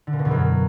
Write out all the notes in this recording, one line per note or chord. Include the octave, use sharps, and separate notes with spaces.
D3
A#2
B2
E2
F#2